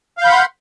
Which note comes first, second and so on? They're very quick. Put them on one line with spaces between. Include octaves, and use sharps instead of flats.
F5 G6 B5 F#5 C6